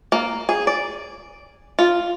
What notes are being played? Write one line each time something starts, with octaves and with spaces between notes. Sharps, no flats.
A#3
G#4
D5
F4